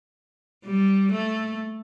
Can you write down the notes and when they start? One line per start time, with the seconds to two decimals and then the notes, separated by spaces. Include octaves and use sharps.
0.65 G3
1.12 A3